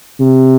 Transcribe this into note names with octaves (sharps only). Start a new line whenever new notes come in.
C3